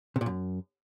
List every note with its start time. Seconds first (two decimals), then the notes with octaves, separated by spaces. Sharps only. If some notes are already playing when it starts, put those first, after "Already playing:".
0.16 C3
0.21 A#2
0.26 F#2